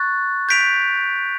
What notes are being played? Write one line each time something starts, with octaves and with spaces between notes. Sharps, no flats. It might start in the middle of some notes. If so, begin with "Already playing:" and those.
Already playing: C#6 F#6 A6
G6 B6 D7 F7